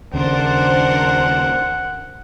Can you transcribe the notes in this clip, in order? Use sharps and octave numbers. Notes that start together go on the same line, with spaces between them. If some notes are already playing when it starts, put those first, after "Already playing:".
D#2 C#3 D4 A#4 C5 F#5